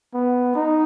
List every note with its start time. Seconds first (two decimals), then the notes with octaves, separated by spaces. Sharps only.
0.14 B3
0.55 D#4